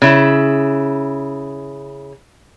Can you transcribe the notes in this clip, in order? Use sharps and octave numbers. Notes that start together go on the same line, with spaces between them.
C#3 E4